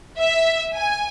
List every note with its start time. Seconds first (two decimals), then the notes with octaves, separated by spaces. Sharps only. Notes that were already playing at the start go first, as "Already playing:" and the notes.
0.18 E5
0.75 G#5